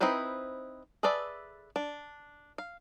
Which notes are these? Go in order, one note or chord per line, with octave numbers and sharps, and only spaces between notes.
C4 D#4 E4 B4 C5
G#4 A4 B4 D5 E5
D4
F5